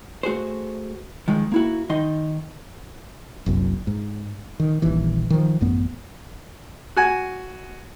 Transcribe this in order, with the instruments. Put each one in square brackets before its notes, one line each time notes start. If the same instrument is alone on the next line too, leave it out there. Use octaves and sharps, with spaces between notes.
[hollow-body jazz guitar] A3 F#4 G#4 C5
D#3 F3 G#3
A#3 E4 F#4
D#3 D#4 D#5 C6
[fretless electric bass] F#1 C2 F#2
G#2
D#3
D#1 A#1 D#2 E3
D#3 F3
A1 F#2 A3 B3
[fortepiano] F#4 G#5